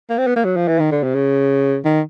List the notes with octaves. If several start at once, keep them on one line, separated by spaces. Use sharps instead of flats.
A#3
C4
B3
A#3
F#3
F3
E3
D#3
D3
C3
C#3
D#3